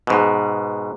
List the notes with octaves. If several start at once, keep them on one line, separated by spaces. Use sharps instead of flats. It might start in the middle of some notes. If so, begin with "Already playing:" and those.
G#2 B2